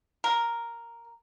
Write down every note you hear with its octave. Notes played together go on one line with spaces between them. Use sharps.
A#4